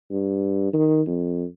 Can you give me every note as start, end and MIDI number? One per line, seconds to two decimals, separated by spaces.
0.11 0.70 43
0.73 1.01 51
1.06 1.44 41